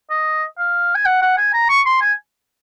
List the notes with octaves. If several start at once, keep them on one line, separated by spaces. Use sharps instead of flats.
D#5
F5
G#5
F#5
F#5
G#5
A#5
C#6
C6
G#5